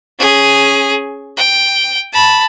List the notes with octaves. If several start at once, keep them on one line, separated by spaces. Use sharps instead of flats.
C#4 G#4
G5
A5 B5